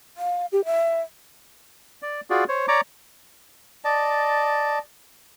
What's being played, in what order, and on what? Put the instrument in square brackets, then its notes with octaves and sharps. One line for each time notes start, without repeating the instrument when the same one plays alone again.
[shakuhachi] F5
G4
E5
[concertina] D5
F4 F#4 G#4 D5
C5 C#5
C#5 D5 A#5 D6
[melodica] D5 D#5 A5